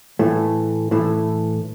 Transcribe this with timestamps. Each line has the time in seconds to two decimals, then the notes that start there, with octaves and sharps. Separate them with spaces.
0.19 A2 E3 A3
0.91 A2 E3 A3